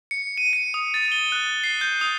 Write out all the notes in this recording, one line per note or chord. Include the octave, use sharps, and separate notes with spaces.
C#7
D#7
C#7
D#6
A6
G7
F#6
C7
G6
D#6